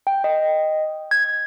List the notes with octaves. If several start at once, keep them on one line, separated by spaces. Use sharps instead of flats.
G5
D#5
G#6